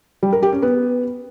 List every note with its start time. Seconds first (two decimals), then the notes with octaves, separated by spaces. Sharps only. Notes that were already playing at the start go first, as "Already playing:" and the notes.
0.23 G3
0.33 A#4
0.42 G4
0.52 C#4
0.62 B3